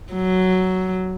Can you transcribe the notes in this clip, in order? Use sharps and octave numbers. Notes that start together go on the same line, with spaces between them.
F#3